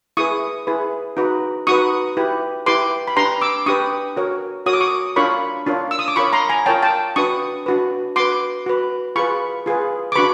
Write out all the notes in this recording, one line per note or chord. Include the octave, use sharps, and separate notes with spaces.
E4 G#4 B4 C#6 D#6
E4 G#4 B4
D#4 F#4 B4
D#4 F#4 B4 C#6 D#6
E4 G4 B4
E4 G4 B4 C6 D6
B5
D4 G4 B4 A#5 C6
D6 E6
D4 G4 B4 C#6 D#6
F#4 A#4 C#5
F#4 A#4 C#5 D#6
D6
C#6 D#6
D4 F4 A#4 C#5 B5 C#6
D4 F4 A#4 C#5
E6
D#6
D6
F4 A#4 C#5 B5 C#6
A#5 C6
G#5 A#5
F4 A#4 C#5 G5 A5
G5 A5
D4 F#4 B4 C#6 D#6
D4 F#4 B4
F#4 B4 C6 D6
F#4 B4
F4 G#4 B4 B5 C#6
F4 G#4 B4
D6
D4 F#4 B4 B5 C#6